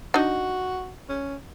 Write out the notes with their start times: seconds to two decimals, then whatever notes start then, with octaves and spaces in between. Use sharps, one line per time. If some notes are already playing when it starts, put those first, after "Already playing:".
0.14 D4 D#4 F#4
1.09 C#4